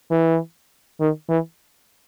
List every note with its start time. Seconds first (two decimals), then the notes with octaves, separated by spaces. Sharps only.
0.11 E3
1.00 D#3
1.29 E3